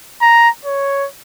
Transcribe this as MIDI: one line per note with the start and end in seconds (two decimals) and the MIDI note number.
0.21 0.49 82
0.65 1.07 73